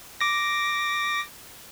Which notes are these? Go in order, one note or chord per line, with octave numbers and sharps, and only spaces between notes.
D6 A#6